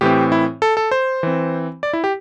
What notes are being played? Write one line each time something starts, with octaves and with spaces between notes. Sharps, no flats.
A2 E3 C4 G4
E4
A4
A4
C5
E3 C4
D5
E4
G4